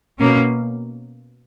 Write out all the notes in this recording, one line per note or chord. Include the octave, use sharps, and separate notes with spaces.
B2 A#3 C#4